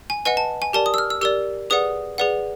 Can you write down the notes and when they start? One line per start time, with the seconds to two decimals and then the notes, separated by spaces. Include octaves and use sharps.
0.10 G#5
0.25 B4 D#5 F#5 G#5
0.37 A5
0.62 G#5
0.73 G4 A#4 D5 A5
0.86 D#6
0.94 E6
0.98 F6
1.10 E6
1.21 G4 A#4 D5 E6
1.70 G#4 B4 D5 F#5 D#6
2.18 G#4 B4 D5 F#5